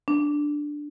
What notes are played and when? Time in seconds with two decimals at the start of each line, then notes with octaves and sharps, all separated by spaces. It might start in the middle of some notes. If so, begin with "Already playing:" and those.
0.08 D4